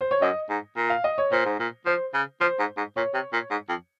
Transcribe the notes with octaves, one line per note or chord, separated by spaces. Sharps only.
C5
C#5
F#2 D#5
G#2
A#2
F5
D#5
C#5
A#2 C5
G#2
A#2
F3 C5
C#3
F3 C5
G#2
G#2
A#2 C#5
C3
A#2
G#2
F2